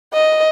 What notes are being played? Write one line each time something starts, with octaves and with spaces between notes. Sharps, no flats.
D#5